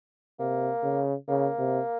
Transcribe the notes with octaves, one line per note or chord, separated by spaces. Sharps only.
C3 A#3
C#3
C#3 A#3
C3